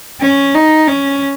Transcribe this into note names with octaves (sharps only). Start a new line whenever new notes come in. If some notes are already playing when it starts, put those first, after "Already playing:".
C#4
D#4
C#4